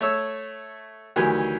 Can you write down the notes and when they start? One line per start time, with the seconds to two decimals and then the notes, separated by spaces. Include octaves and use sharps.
0.01 A3 C#5 E6
1.16 D2 D#3 E3 F#3 G4 G#5